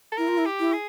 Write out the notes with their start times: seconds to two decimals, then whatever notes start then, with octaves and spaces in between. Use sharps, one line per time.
0.12 A4
0.17 E4 A#4
0.28 F4
0.38 E4
0.46 G4
0.60 E4
0.73 G#4